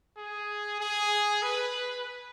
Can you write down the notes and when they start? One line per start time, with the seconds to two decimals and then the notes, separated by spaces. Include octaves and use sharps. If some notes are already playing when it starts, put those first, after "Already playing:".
0.17 G#4
0.80 G#4
1.43 B4